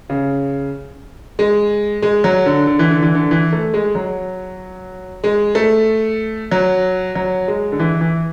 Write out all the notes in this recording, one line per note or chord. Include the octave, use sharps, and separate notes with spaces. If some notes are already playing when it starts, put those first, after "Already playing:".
C#3
G#3
G#3
F#3
D3
D3
E3
D3
E3
D3
E3
A3
G#3
F#3
G#3
A3
F#3
F#3
G#3
D3
E3
E3